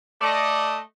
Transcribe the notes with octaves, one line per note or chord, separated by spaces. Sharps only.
A3 D5 D#5